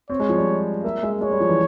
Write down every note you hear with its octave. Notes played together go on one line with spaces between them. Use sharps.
C4 C#5
G#3
F3
G3
A#3 E5
G#3
G#3 C#5
G3
F3
E3